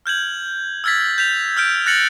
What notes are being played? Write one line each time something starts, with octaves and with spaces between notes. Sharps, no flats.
F6 G6 G#6 F#7
E6 F6 G#6 A6 B6
G6 B6 F7
E6 F6 G6 D7
F#6 A6 A#6 C#7 F7 F#7